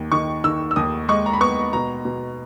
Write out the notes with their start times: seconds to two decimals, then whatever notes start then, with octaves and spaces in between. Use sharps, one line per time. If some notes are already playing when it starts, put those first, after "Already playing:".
Already playing: D#2
0.12 D#3 C#6
0.44 D#3 E6
0.71 E6
0.76 D#2 D#6
1.09 G#3 C#6
1.26 A#5
1.33 B5
1.41 B3 C#6
1.73 B2 A#5
2.05 B2